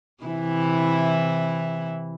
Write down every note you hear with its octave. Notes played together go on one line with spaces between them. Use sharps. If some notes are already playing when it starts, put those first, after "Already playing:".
C3 E3 E4